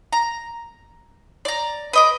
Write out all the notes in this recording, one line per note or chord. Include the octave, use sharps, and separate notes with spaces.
A#5
D5 A#5
B4 D#5 D6